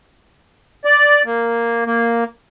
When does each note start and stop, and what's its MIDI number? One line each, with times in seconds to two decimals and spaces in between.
0.85 1.22 74
1.25 1.84 58
1.86 2.24 58